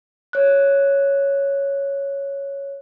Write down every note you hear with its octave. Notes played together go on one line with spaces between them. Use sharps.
C#5 F#6